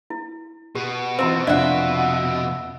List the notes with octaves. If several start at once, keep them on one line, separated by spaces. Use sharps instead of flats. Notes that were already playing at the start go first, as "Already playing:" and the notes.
E4
B2 G4
E3 C4 F4 F#4 C5 A5 A#5
F2 C3 D4 F4 F#4 D5 E5